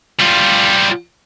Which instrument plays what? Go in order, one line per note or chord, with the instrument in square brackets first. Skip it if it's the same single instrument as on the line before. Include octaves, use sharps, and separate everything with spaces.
[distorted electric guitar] G3 F4